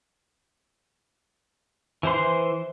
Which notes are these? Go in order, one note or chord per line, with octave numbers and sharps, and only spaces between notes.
E3 C5 C6